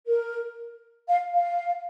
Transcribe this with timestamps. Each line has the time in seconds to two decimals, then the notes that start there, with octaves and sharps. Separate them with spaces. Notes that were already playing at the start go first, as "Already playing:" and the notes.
0.07 A#4
1.08 F5
1.33 F5